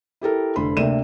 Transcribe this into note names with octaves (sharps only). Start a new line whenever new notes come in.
E4 G4 A4 A#4
F1 D3 C5 B5 C6
D2 C3 A#3 D4 D#7 E7